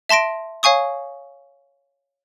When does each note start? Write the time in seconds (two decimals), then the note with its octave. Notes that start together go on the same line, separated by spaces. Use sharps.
0.09 E5 A5 C6 A#6 D7
0.63 C#5 F5 G#5 C#6 D#6